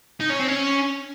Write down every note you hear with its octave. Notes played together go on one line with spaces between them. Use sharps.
D#4
C#4
C4
C#4